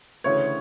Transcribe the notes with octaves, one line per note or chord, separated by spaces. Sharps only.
D2 C#3 E3 C#5